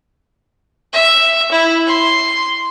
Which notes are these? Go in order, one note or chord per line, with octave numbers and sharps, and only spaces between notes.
E5
E4
C6